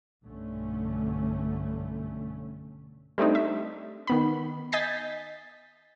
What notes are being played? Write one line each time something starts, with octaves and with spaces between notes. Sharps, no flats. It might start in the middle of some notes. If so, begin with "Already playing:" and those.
B1 G2 D3 A3 C#4
G3 A3 C4 D4 D#4
E5
D#3 B3 B5
D#5 G#5 G6 A6 B6 C7